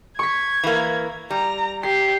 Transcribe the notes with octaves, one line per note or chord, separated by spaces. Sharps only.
C#6 G#6 B6
E3 A#3
G3 A#5
G4 C7